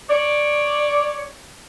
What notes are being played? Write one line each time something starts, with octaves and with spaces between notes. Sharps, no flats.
C#5 D5